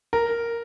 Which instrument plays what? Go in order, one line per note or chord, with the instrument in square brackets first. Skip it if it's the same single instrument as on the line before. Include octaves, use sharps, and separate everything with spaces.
[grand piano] A#4